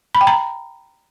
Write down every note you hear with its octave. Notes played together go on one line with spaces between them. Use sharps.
B5
G5
A#5